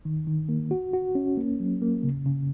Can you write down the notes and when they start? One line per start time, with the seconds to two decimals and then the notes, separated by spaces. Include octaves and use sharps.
0.05 D#3
0.27 D#3
0.49 A#3
0.71 F#4
0.93 F#4
1.15 C#4
1.37 A#3
1.60 F#3
1.82 A#3
2.03 C#3
2.26 C#3